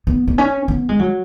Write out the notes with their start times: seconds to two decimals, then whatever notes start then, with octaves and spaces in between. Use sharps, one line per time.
0.07 B3
0.28 B3
0.38 C#4
0.68 B3
0.89 G#3
0.99 F#3